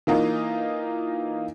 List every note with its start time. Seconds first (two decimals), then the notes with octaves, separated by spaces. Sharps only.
0.07 E3 A#3 D#4 F4